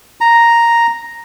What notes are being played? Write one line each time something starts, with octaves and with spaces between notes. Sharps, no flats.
A#5